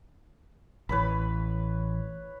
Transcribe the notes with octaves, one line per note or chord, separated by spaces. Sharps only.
A1 E3 B4 C#5 B5